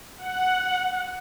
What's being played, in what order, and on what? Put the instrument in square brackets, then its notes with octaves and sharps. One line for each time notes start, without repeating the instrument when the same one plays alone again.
[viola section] F#5